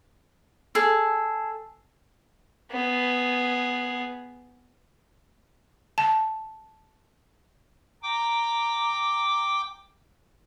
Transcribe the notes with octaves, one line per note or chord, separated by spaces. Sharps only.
G#4 A4
B3 G#4
A5
G5 A#5 D6